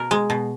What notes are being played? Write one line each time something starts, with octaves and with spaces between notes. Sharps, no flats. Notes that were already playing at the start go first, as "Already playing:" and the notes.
Already playing: B2 A#4
G#3
B2